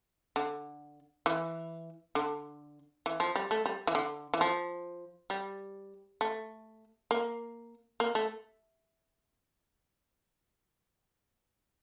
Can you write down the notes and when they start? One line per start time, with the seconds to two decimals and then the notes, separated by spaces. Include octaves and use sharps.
0.36 D3
1.26 E3
2.15 D3
3.06 E3
3.20 F3
3.36 G3
3.51 A3
3.66 G3
3.87 E3
3.95 D3
4.34 E3
4.41 F3
5.30 G3
6.21 A3
7.11 A#3
8.00 A#3
8.15 A3